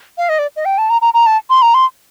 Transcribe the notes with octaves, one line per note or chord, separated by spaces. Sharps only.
F5
D#5
D5
D#5
G5
A5
A#5
A#5
A#5
A5
C6
A#5
C6